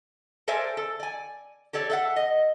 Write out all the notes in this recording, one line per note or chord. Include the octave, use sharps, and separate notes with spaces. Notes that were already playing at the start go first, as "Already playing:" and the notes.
A4 A#4 C5 D5 E5 G#5
A4
D5 G#5
G4 A4 C#5 D5
A4 E5 F#5
D#5